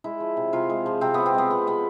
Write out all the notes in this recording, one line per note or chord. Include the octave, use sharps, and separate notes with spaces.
G#3 E4
F3
C3
C3 F4
G#3
F3
C3 C4
C3 B3
C4
G#3 B3
F3 B3
C3 B3